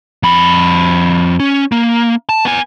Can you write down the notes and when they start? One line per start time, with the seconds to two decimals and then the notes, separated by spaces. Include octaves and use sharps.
0.23 F2 B5
1.40 C#4
1.72 A#3
2.29 A5
2.45 B3 G#5